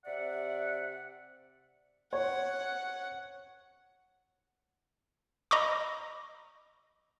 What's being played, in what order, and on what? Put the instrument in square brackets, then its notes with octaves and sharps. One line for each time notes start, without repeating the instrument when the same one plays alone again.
[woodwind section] C3 D5 E5 F#5
[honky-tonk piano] C#5 [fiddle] F#5
[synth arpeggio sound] D#5 A#5 B5 C#6 D6